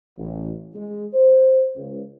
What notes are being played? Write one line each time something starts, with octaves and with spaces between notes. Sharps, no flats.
A1
G#3
C5
C#2